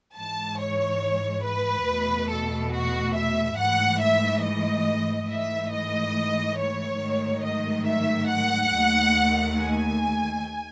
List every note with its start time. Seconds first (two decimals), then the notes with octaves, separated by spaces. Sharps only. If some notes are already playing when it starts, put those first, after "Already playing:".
0.16 G#2 E3 G#3 A5
0.59 C#5
1.45 B4
1.88 E2 B2 A3
2.30 A4
2.73 F#4
3.16 E5
3.58 G#2 E3 A3 F#5
4.02 E5
4.44 D#5
5.29 G#2 E3 A3 E5
5.73 D#5
6.59 C#5
7.01 G#2 D#3 F#3 A3
7.45 D#5
7.88 E5
8.29 F#5
8.73 D#2 D#3 A3
9.58 G#5